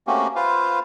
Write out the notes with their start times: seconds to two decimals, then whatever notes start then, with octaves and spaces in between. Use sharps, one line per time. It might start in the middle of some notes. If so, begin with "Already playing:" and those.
0.07 A3 A#3 C4 C#4 F#4 G4
0.36 F4 B4 C5 F5